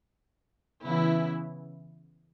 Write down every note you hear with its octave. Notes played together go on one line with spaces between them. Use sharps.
C#3 E3 B3 E4